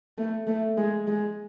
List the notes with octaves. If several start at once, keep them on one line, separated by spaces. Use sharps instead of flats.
A3
A3
G#3
G#3